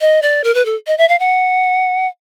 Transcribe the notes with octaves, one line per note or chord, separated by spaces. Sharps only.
D#5
D5
A#4
B4
A4
D#5
E5
F5
F#5